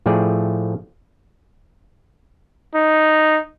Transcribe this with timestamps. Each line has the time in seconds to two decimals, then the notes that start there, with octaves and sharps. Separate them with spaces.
0.06 A2 F3 A3 G#4 D5 G5
2.75 D#4